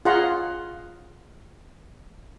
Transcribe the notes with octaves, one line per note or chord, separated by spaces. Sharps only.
F4 G#4 C#5 F#5 A#5 C6